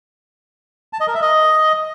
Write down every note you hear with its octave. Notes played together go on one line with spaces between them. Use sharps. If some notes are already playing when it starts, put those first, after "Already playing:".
A5
D#5
A#4
E5
D#5